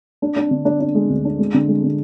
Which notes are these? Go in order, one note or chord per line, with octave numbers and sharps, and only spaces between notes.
D4
D4
D3
D4
D4
G#3
D2
D4
G#3
D3
G#3
D3